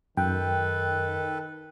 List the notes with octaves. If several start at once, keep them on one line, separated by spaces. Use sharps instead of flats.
F#2 D#3 A4 B4 G5